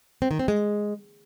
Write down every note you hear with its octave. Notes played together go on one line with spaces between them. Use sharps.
C4
D#3
C4
G#3